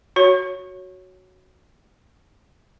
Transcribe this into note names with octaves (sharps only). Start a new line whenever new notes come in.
F#4 C#5